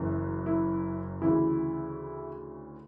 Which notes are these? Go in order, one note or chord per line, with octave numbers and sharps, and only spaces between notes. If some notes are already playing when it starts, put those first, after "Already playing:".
Already playing: F#1 F#2 E3
E4
D2 C#3 E3 E4